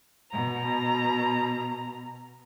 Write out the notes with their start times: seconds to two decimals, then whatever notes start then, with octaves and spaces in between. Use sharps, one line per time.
0.32 B2 A#5